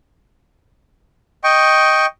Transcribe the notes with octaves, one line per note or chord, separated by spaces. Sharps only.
D#5 G5 C#6